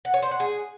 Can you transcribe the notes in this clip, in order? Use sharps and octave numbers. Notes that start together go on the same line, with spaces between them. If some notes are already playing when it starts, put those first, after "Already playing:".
F#5
C#5
C5
F#5
G#4